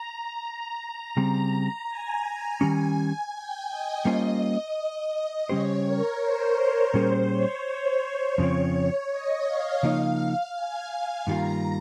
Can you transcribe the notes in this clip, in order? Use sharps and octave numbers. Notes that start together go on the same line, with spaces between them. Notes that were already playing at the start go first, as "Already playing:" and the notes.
Already playing: A#5
C#3 G3 C4 A#5
G#5
D#3 G3 C#4
G5
D#5
G3 A#3 C#4 F4 C5
C#3 G3 C#4 G4 C5 C#5
A#4
C5
C#5
A#2 G3 C#4 G#4 C5
C#5
C#5
F2 C#3 F3 C4
D#5
F5
C#3 F3 A#3 D#4
G#5
G2 D#3 G3 A#3 F4 A#5